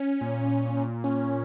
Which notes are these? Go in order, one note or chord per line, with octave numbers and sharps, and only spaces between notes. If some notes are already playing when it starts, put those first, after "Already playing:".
Already playing: C#4
A#2
C#4
A#2
C#4